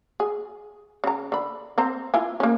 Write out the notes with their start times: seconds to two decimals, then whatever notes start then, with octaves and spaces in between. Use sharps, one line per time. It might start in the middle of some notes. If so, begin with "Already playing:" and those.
0.20 G#4
1.04 C#3 A#5
1.32 D3 B5
1.78 C4 C5 A#5
2.14 E4 F4 G#5
2.40 A#3 C#4